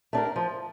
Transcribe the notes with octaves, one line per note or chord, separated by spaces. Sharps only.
A3 D4 G4 A#4
F3